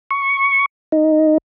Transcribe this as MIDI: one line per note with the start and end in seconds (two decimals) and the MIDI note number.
0.11 0.66 85
0.92 1.38 63